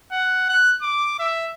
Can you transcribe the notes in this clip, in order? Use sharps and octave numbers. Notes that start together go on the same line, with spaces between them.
F#5
F#6
D6
E5